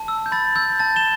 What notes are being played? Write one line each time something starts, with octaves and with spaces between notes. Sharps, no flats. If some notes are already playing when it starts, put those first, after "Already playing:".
Already playing: A5
E6
G6
B5 A6
E6 G6
A5 A6
E7 G7